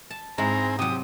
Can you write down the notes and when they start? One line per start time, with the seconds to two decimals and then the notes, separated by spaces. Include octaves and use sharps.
0.10 A5
0.38 G#2 C4 E4 G#4 A#5
0.79 C3 F#3 G4 D#6